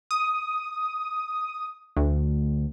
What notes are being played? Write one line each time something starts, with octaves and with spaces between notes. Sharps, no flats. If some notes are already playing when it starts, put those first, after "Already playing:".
D#6
D2